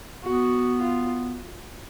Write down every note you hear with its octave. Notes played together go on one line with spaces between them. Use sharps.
B3 F#4
F4